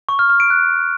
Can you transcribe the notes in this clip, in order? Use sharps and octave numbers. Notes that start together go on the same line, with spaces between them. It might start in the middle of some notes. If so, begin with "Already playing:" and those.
C#6
F6
F6
D7
F#6